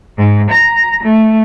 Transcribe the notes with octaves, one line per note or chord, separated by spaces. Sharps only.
G#2
A#5
A3